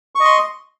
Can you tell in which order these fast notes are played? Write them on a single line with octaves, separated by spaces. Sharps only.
C#6 D#5 C6